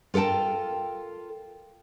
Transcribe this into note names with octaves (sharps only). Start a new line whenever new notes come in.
F4 A4 A#4 G5 A5